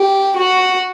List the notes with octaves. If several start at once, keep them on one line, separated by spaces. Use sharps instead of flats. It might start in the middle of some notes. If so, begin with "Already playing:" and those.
Already playing: G4
F#4